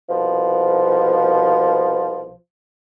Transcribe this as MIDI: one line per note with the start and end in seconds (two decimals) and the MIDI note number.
0.09 2.33 36
0.09 2.33 47
0.09 2.33 53